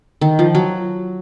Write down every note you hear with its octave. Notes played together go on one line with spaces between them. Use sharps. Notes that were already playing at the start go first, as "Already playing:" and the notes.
D#3
F3
F#3